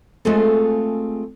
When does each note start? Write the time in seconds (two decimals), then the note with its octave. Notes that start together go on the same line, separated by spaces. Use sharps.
0.25 G#3 A3 C4 F4 G#4 A4